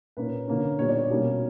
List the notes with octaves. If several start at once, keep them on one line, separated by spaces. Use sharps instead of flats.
A#2 A#3 C#4 B4
D3 A#3 C#4
A#2 G3 B3 C#5
D5
C#5
B2 G3 A#3 C#4